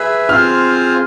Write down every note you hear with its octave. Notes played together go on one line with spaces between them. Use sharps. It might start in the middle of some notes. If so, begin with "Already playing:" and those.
Already playing: G#4 B4 E5 F#6
C4 F4 G#4 C5 F5 F6